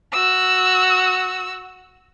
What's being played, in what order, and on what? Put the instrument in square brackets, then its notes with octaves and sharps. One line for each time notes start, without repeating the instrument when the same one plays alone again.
[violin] F#4 E6